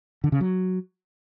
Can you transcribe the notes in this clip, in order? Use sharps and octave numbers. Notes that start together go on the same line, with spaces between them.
D3
C#3
F#3